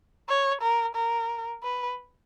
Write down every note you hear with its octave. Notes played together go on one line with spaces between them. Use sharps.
C#5
A#4
A#4
B4